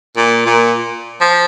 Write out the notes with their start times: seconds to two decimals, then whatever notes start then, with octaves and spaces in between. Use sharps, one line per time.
0.17 A#2
0.46 A#2
1.21 F3